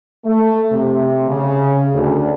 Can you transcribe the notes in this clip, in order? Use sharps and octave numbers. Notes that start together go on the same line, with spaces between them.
A3
C3
C#3
D2